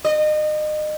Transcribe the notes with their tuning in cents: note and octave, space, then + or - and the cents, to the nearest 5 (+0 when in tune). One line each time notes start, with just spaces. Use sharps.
D#5 -30